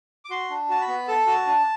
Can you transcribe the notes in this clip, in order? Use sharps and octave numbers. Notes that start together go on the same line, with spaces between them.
D6
F#4 C6
D4
F#4 A5
B5
B3
A4 A5
F#4
D4